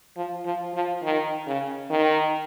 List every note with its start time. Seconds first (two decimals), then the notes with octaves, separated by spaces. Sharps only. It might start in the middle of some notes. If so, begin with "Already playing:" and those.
0.17 F3
0.46 F3
0.74 F3
1.03 D#3
1.47 C#3
1.90 D#3